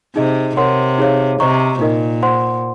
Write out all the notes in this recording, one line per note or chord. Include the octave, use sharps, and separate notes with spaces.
C3 D#4 G#4 D#5
C3 A#4 C#5 F#5 C6
D#4 G#4 C#5 F5
C3 C5 D#5 A#5 C#6
A#2 D#4 A#4 D#5
C5 F#5 C6